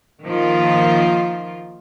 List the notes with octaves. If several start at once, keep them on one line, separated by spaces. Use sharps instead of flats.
D#3 F3 A#3 F4